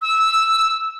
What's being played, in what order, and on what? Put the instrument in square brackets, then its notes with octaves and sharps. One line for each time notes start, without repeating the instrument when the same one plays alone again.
[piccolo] E6